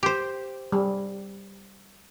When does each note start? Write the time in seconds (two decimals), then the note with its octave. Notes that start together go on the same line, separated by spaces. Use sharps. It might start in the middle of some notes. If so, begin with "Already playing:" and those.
0.03 G4 C5
0.72 G3